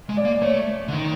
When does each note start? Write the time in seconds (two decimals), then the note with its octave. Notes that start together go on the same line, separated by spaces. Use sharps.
0.09 G#3
0.17 D5
0.25 A#3
0.42 A3 C#5
0.88 D3
0.93 D#3